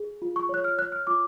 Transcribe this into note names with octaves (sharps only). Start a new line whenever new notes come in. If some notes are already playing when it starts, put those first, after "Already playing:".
Already playing: G#4
F4
C#6
C#5 F#6
F6
C#5 F#6
F6
F4 D6